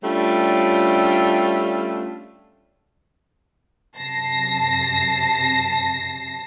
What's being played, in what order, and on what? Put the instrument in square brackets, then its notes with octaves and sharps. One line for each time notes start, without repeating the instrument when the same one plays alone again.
[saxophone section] G3 A3 C#4 D4 F4
[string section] F#2 C3 A5 A#6 C7